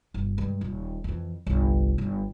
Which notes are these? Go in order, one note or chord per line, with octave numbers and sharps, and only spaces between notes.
G1
G2 G#3
D#1
F2 E3
G1 C2
G1